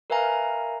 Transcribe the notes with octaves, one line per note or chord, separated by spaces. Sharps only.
A#4 B4 E5 F5 G#5 A#5